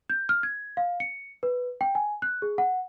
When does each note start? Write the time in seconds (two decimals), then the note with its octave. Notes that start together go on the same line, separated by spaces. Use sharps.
0.10 G6
0.29 F6
0.43 G#6
0.77 F5
1.00 C#7
1.43 B4
1.81 G5
1.95 G#5
2.22 F#6
2.42 G#4
2.58 F#5